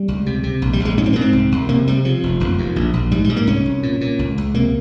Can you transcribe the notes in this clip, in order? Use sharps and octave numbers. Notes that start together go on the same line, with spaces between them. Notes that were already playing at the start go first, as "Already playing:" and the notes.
Already playing: G3
C#2
C3
C3
A#1
G3
A#1
G#3
G#2 C#4
C4
G#2 A#3
C4
C2
C2
C3 A#3
C3 G3
C#3 F3
F1
F1
D#2
A#1
A#1
G#2 G3
G3
G#2
A#3
C2 C#4
C2
A#2
A#2
C#2
C#2
C3 A#3